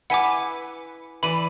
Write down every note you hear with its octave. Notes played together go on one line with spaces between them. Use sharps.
E4 B4 F#5 G#5 D6
E3 B4 D5 B5 D#7